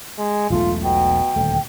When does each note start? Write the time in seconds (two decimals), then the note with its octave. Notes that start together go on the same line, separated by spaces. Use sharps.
0.18 G#3
0.50 E1 B1 A3 F4
0.84 B2 G5
1.36 D#1 D2 A3